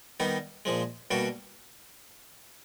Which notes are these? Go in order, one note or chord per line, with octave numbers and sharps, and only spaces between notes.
D#3 G3 B3 D#4
A#2 F3 G#3
B2 G3 A#3 D4 F#4